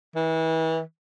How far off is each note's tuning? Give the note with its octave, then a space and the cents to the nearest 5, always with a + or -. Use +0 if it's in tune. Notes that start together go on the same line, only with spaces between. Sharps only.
E3 -35